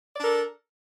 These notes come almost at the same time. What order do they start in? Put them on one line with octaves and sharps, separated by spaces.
D5 D4 A#4 A4